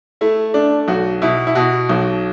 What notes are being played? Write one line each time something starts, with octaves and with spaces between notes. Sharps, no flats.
A3 E4
A3 D4
B1 F#4
B2 E4
E4
B2 F#4
B1